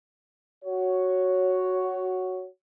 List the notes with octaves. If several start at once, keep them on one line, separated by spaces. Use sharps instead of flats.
F#4 C#5